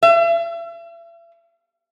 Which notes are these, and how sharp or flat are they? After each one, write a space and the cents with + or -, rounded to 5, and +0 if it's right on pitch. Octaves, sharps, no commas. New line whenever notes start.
E5 +40